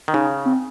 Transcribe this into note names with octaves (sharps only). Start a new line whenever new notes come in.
D#3
C#3 D#4
C4